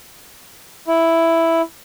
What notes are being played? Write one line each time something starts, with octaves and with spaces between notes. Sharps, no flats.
E4